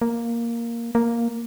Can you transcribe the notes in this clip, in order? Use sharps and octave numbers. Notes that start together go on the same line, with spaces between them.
A#3
A#3